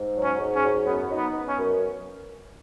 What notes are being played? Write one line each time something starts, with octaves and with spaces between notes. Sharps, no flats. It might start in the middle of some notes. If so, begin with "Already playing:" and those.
Already playing: G#2
F#3
C#4
G#2
C#4
F#3
F#2 B3
D#4
B3
B3
C#4
F#2